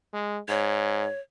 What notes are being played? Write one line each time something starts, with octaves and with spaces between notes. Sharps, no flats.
G#3
G#2 C#5